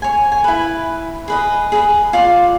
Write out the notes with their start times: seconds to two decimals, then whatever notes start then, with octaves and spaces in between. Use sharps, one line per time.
0.02 C#5 G#5
0.32 G#5
0.44 E4 B4
1.28 G#4 B4 D#5
1.72 G#4 B4 D#5
2.13 F4 D5 F5